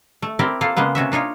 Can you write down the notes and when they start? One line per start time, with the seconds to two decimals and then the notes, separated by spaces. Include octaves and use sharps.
0.22 A3
0.39 C4 E4 G4 A#4 D5 G5
0.61 A#3 F4 A4 F5
0.77 C#3 G#3 A#3 B3
0.95 C3 C#4 F#4 E5
1.12 D4 D#4 F4 C#5